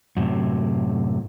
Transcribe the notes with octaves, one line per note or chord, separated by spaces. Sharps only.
F#2 A2 C3